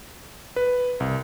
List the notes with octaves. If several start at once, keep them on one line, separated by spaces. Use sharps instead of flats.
B4
C2